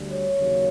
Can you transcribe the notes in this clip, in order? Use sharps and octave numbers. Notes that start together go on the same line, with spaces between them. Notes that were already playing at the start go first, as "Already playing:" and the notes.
Already playing: D2 D3 G3
C#5
D#2 C#3 F#3